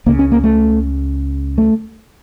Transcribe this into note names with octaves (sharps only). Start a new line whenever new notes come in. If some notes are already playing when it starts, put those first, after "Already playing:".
C#2 C#3 A#3
C#4
A#3
A3
A3